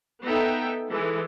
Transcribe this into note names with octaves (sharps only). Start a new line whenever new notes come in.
B3 D#4 A4 E5 G5
E3 G#3 A4